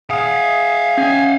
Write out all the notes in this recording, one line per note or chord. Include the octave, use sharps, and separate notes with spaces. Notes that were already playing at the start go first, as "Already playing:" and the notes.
G#4 F5 F#5
C#4 G#5